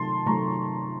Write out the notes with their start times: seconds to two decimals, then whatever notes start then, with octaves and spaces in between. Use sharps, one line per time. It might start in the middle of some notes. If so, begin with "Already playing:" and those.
Already playing: C3 D#3 F#3 A3 A5 C6
0.26 C3 D#3 F#3 A3 A#5 C#6